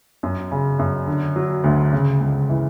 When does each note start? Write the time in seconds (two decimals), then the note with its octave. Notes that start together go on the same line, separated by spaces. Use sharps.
0.23 F#2
0.52 C#3
0.79 F#2
1.07 D3
1.36 F#3
1.64 D2
1.93 C#3
2.21 C#2
2.49 E3